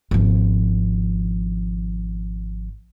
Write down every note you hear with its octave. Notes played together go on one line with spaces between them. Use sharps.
G#1 F3